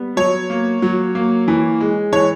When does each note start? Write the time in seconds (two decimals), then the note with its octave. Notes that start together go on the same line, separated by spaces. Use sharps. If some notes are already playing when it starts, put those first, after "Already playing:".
Already playing: G3 B3
0.17 F#3 C#5
0.50 A#3
0.82 F#3
1.15 A#3
1.48 E3
1.80 G#3
2.12 E3 C#5